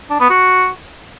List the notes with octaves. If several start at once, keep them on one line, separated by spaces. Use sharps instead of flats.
D4
B3
F#4